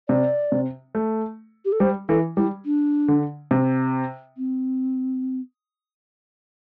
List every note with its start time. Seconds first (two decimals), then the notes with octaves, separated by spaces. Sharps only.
0.09 C3 D5
0.52 C3
0.95 A3
1.65 G4
1.72 A4
1.80 G3 C5
2.09 E3 A4
2.37 G3 E4
2.66 D4
3.08 D3
3.51 C3
4.38 C4